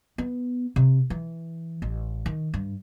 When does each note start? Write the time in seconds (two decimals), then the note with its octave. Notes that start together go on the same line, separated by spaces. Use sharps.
0.18 B3
0.76 C3
1.10 E3
1.82 A1
2.26 D#3
2.54 G2